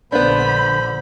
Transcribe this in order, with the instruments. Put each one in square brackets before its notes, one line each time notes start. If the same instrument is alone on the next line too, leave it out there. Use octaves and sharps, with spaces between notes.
[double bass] A#1 D3 [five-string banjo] B3 D4 [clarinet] C5 [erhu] B5